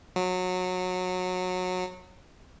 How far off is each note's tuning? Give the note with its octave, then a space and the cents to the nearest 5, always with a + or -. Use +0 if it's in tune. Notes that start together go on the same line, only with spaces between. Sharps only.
F#3 -20